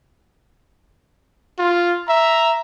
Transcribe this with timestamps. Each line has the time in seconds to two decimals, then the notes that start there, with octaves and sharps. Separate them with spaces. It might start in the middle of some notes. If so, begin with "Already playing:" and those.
1.59 F4
2.09 E5 A#5